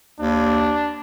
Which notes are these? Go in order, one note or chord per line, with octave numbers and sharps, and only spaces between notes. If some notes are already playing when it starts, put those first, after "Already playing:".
D#2 D4